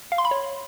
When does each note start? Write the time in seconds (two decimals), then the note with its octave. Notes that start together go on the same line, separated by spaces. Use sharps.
0.12 F5
0.18 C6
0.25 B5
0.31 C#5